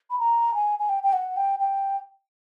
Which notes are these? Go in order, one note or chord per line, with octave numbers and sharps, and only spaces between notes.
B5
A#5
G#5
G#5
G5
G5
F#5
G5
G5